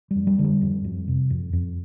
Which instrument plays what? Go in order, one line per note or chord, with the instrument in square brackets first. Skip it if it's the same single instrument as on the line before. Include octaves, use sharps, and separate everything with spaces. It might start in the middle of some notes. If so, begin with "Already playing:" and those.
[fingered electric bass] F2 G3
G3
D3
G3
F2
F2
C3
F2
F2